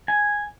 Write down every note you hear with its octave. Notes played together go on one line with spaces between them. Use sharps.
G#5